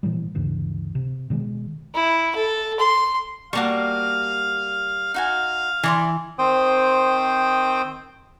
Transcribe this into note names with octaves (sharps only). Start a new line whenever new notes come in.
A#2 E3 F3 G3
D2 G2 C#3 E3
C3
B2 D#3 G3 G#3
E4
A4
C6
G3 A#3 F#4 F5 A5 C#6
D#4 F#4 F5 G#5
E3 E4 D5 C6
D#3 C4 C5 G5 D#6